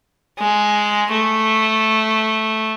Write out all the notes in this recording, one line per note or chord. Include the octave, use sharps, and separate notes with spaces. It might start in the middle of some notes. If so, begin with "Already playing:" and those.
G#3
A3